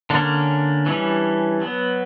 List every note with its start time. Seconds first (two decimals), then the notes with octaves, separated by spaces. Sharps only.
0.10 D3 A#3 C#4 D4
0.86 E3 G3 C#4
1.62 F#3 B3